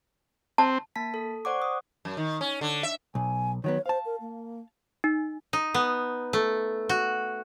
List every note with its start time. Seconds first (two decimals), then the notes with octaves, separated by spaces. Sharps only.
0.58 C4 A5
0.96 A#3 A5 B6
1.14 A4
1.45 C5 D5 F#5 C#6 D6
1.62 D#6
2.05 F#2
2.17 D#3
2.41 C#4
2.61 D3
2.83 E5
3.15 B1 G#5
3.64 D#3 F#3 B3 C#5
3.86 C5 F5 A5
4.06 A#4
4.21 A#3
5.04 D#4
5.53 D#4
5.74 B3
6.33 A3
6.89 F#4